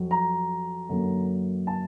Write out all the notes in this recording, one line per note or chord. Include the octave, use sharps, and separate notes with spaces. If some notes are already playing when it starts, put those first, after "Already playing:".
Already playing: F2 F#3
A#5
F#2 D3 F#3 A#3
A5